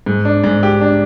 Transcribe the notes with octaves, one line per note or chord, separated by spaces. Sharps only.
G#2
D4
G#2
G4
D4